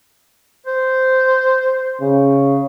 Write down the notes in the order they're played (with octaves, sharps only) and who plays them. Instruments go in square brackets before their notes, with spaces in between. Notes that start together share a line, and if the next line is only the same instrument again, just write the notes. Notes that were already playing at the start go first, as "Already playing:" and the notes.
[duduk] C5
[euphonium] C#3